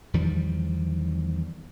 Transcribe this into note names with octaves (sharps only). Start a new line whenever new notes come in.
E2 D#3 F3 G3